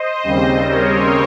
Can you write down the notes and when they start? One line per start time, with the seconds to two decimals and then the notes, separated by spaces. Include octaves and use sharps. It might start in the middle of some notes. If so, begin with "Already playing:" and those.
Already playing: C5 D#5
0.24 D#2 C#3 G3 C4
0.69 A#4 C#5